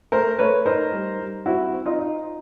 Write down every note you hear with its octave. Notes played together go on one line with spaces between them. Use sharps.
A3 A#4 C5
A3 B4 C#5
D#4 A#4 C5
G3
G3
C4 E4 F#4
C4
D#4 F4
D#4